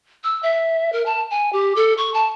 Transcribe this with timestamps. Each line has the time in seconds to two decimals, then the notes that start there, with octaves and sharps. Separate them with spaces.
0.24 E6
0.43 E5
0.93 A#4
1.06 A5
1.30 G#5
1.53 G4
1.76 A4
1.98 C#6
2.14 A5